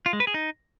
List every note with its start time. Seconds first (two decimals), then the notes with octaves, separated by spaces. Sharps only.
0.06 F4
0.13 G#3
0.20 B4
0.27 G#4
0.34 D#4